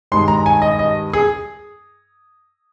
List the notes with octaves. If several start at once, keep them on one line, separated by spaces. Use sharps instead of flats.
G2 D#3 G#3 C6
A#5
G#5
D#5
D#5
G#4